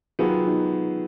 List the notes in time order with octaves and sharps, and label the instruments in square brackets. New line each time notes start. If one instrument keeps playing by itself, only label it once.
[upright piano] D#3 F#3 B3 [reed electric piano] F4 G#4
[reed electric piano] D#4 F#4